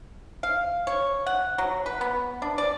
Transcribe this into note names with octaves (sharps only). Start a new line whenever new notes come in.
F5
C#5
F#5
F#3
B4
B3
D4
D5